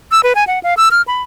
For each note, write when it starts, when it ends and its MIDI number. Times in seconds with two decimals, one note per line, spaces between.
0.11 0.21 88
0.23 0.33 71
0.35 0.47 80
0.47 0.59 78
0.63 0.74 77
0.77 0.89 88
0.91 1.02 89
1.08 1.22 83